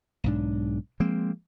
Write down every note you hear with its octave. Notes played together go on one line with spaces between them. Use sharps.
B1 G#2 D4
F3 G#3 A#3 C4